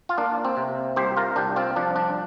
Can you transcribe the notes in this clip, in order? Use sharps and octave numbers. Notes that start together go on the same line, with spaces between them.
F4
A#3 D4
C4
C3
C2 G4 C5
F4 A#4
C2 D4 G4
C4 F4
F3 D4
D4